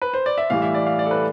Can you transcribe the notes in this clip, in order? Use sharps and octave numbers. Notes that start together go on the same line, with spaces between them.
B4
C5
D5
E5
A2 E3 G3 F5
E5
D5
F5
D5
A4
B4